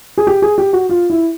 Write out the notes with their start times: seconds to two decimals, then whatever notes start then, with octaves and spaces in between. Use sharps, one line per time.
0.17 G#4
0.27 G4
0.42 G#4
0.58 G4
0.73 F#4
0.89 F4
1.10 E4